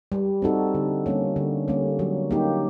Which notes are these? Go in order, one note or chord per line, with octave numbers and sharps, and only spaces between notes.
G3
C4 D#4 F#4 A4
D3
G3 A#3 C#4
D3
G3 A#3 C#4
F#3
A#3 D#4 G4